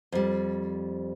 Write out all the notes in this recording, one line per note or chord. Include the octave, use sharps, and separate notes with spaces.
F2 G3